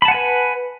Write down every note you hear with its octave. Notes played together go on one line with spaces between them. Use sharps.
B4 F#5 G#5 A5 B5